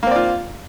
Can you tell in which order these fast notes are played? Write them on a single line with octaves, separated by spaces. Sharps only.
A#3 C4 D5 F4